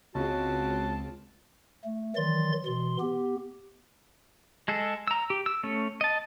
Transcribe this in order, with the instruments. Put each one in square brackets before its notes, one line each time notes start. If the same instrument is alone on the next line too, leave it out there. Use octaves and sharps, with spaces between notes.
[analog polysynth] C#2 [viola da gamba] C#3 C4 F4 [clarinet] F#4 [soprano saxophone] A5
[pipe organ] A3
D#3 E3 F#3 D5 C6 A6
B2 E3 C6
B3 G4
[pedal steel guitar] G#3 G#4 A4
A#5 E6
G4
E6
A3 C#4
D#5 A5